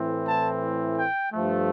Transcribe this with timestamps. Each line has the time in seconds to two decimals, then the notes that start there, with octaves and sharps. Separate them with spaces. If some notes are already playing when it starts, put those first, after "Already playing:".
Already playing: A2 E3 A3 C4
0.27 A5
0.97 G5
1.32 G2 F3 A3